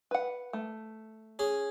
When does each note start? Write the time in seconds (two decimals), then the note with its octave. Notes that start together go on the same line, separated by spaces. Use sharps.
0.11 B4 F#5
0.53 A3
1.39 C#4 G#4